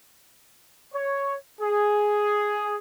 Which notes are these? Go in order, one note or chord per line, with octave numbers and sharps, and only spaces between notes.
C#5
G#4